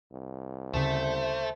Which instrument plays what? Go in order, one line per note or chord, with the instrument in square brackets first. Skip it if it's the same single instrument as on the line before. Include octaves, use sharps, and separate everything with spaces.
[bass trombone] C2
[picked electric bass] D2 C#3 [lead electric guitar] A3 [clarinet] C5